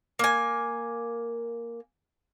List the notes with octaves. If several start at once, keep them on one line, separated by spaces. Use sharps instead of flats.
A#3 G#5